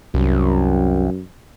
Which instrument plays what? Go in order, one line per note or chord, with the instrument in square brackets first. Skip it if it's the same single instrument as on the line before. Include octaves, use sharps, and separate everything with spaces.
[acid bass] C2 [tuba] F#2